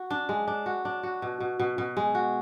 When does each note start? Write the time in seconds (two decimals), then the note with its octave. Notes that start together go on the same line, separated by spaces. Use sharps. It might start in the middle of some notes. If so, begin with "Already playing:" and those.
Already playing: F#4
0.11 D4
0.29 G#3
0.48 D4
0.66 F#4
0.85 D4
1.03 F#4
1.22 B2
1.40 B2
1.60 B2
1.78 B2
1.97 G#3
2.15 F#4